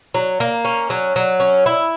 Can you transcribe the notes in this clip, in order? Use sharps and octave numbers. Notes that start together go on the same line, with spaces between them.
F#3
A#3
C#4
F#3
F#3
C#4
E4